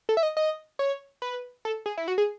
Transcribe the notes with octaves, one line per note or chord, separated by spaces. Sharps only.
A4
E5
D#5
D#5
C#5
B4
A4
G#4
E4
F#4
G#4